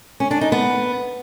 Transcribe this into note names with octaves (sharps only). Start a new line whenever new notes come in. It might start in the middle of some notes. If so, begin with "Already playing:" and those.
C#4
D4
D#4
B3